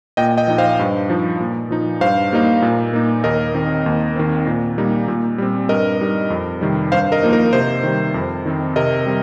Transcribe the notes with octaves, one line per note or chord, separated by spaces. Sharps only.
A#2 D#5 G5
D#5 G5
F3 D#4
C5 F5
G2
F3 D#4
A#2
F3 D#4
G2 C5 F5
G3 A#3 D#4
A#2
A#3 D#4
D#2 A#4 D#5
D#3 C4 D#4
D#2
D#3 C4
A#2
G3 A#3 D#4
A#2
G3 C4
G2 A#4 D#5
G3 D#4
F2
C3 D#3 G3
G2 C5 F5
A#4 D#5
F3 A#3 D#4
A#4
C3 C5
D#3 G3
F2
D#3 C4 D#4
C3 A#4 D#5
G3 C4